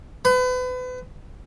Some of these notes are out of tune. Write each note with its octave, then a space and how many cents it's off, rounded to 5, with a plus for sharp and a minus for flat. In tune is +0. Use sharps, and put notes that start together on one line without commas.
B4 +35